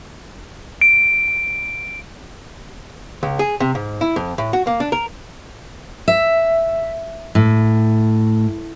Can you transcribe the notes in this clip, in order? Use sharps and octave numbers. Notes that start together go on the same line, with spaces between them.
D7
C#2
G#4
C3
G#2
E4
F2
A2
F#4
A#3
D4
A#4
E5
A2